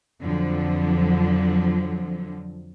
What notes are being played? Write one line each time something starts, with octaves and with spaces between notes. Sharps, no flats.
F2 D3 F3 F#3